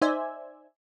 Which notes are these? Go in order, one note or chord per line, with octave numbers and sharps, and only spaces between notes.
D#4 C5 D5 E5 G#5